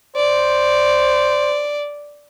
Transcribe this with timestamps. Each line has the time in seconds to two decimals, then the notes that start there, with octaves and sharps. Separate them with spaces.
0.16 C5 D5